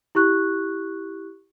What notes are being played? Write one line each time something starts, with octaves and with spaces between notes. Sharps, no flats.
E4 G4 C#6 F#6